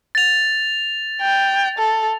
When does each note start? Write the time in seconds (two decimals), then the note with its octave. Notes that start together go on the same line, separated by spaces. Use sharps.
0.15 A6 F7
1.21 G5
1.78 A4